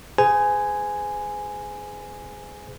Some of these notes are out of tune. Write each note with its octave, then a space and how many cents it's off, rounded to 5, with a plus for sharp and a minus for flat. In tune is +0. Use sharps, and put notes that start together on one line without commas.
G#4 +0 C5 -45 G#5 +0